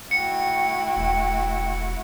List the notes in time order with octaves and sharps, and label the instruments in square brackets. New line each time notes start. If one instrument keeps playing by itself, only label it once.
[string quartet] A3 E4 F#4 [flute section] G5 [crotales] C#7
[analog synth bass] E1